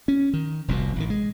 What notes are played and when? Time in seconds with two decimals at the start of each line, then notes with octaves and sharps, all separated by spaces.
0.08 C#4
0.33 D#3
0.68 F1 C2 F2 B2
0.96 A1 D#3
1.10 G#3